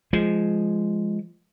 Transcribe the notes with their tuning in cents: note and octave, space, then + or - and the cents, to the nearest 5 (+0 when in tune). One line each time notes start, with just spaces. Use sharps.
F3 -15 G#3 +0